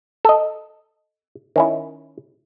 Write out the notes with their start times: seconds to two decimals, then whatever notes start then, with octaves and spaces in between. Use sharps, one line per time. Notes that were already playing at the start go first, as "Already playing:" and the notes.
0.25 A4 D#5
1.56 D#3 C#4 E4